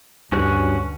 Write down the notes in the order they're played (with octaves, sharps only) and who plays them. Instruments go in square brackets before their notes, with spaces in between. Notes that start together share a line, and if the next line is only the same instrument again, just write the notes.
[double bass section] D2 D3 [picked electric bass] G2 [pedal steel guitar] C#4 F#4 F#6